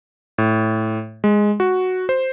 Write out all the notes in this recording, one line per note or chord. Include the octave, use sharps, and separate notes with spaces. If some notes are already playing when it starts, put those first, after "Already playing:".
A2
G#3
F#4
C5